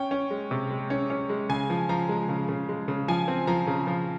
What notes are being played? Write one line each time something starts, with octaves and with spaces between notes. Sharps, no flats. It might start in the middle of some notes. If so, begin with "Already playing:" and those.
Already playing: C#4 G5
C#4
G#3
C3
G#3
C#4
C#4
G#3
C#3 G#5
F3
F3 A#5
G#3
C#3
C#3
G#3
C#3
F3 G#5
C4
F3 A#5
C#3
F3